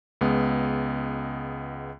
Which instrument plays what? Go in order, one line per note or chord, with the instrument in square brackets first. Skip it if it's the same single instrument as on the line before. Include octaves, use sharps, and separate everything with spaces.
[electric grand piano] C#2 G#3 B3